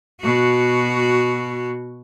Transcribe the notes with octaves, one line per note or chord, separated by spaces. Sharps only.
B2 F#4